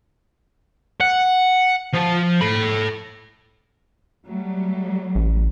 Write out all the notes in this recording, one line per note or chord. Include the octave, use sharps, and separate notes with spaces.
F#5
F3
A4 B5
F#3 G3 A3
A1